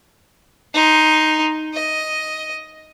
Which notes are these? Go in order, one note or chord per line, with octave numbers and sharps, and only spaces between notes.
D#4 C6
D#5